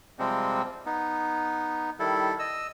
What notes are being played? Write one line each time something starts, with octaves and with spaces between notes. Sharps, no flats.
C3 F3 G3 G#3 C4
B3 D#4
D#3 G3 E4 A4
D#5 E6